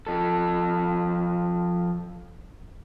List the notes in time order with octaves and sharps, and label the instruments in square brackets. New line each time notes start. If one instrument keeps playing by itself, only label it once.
[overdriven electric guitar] F3 A4